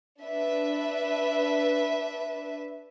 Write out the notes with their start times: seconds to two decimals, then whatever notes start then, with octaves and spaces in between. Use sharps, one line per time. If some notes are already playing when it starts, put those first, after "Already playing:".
0.22 D4 B4 E5